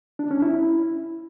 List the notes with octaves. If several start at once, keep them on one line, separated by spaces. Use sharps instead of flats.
D4
C#4
E4